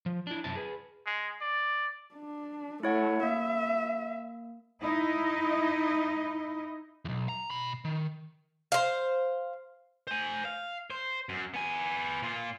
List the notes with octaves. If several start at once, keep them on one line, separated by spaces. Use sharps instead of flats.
F3
D4 E4
F#2 C3 E4 A5
G#4 B4
G#3
D5
D4
A3 E4 C#5 F#5
A#3 E5
D#4 E4 D#5
B1 E2
A#5
B2 B5
D#3
C5 F5
C5 G#5
F5
C5
F#2
B3 G#5
A#2 F4